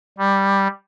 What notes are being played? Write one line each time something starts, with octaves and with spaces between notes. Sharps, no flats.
G3